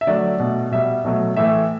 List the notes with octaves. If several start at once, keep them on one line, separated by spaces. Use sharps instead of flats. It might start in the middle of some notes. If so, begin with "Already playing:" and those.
E5
D3 F#3 A3 D5
B2 A3
B2 G3 E5
B2 F#3 A3
A2 E3 A3 E5